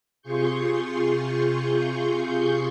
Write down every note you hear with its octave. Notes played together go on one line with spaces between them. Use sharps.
C3 F4 G#4 C6 C#6 G6